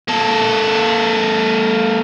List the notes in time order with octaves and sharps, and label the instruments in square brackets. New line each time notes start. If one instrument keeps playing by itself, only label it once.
[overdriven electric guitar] A#3 A4